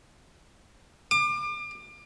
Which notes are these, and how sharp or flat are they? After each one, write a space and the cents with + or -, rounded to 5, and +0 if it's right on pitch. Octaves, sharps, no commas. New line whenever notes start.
D6 +35